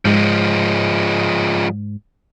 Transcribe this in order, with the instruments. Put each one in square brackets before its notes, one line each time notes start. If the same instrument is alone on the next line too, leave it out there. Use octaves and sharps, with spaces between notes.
[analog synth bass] G#2 [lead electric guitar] F3 G#3